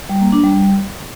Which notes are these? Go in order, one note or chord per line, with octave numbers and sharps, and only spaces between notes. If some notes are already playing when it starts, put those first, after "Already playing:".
G3
A#3
D4
G3